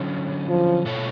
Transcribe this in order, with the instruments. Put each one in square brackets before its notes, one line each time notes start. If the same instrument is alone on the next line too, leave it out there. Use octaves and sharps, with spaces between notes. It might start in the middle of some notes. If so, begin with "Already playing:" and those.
Already playing: [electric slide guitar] D3 F#3 C#4
[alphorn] F3
[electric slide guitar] B2 A3 F4 A4 C#5